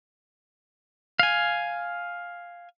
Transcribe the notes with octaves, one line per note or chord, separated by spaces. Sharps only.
F5 G#5